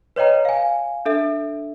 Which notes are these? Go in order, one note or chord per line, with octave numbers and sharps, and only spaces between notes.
B4 C#5 D#5 G5 A#5
F5 G#5
D4 A4 E5